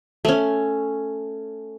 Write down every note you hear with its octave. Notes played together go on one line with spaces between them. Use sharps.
A3 C#4